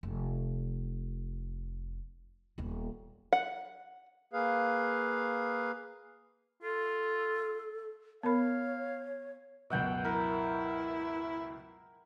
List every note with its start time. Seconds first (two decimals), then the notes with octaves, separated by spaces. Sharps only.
0.03 F1
2.58 D#1 B3
3.33 F#5
4.33 A#3 G#4 B4 F5
6.62 F4 A4
8.23 B3 A#4 C#5 F5 B5
9.70 C#2 F#2 B2 E5 F#5 G5
10.05 E4 A#4